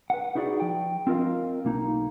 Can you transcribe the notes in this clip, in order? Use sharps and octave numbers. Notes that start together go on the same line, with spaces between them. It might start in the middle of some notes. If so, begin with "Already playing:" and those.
B4 F#5
D#4 E4 F#4 G#4 D5
F3 G5
C4 F4 A#4 D#5 F5
B1 A#3 D#4